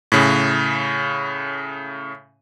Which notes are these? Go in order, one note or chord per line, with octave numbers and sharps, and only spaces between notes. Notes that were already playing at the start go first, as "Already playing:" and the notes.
A2 C#3